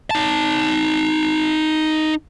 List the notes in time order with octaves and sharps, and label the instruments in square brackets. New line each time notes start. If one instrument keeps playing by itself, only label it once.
[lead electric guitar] D#4 A5